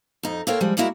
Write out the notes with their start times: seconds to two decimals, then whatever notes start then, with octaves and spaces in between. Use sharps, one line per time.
0.23 F2 D#4
0.47 A#3 A4 A#4 C5 C#5 G5
0.61 F3 G3 G#3
0.77 G3 G#3 A#3 E4 F#4 A#4